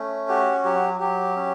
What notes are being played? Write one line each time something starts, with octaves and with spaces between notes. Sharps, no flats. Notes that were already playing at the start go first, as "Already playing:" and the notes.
Already playing: A3 C#4
F#4 G4
F#3 G4
F#3 G4
C#4